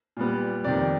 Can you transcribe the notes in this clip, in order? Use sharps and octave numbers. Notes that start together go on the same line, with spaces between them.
A#2 G3 B3
F2 C3 D#3 D5